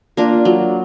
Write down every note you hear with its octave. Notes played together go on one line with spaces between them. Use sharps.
A#3 D4 F4
F#3